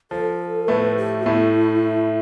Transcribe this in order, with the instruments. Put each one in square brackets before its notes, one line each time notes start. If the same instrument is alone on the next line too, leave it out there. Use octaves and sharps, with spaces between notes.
[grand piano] F3 [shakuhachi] A4
[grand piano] A2 A3 [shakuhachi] B4
[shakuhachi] G4
[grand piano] A2 A3 [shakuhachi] E4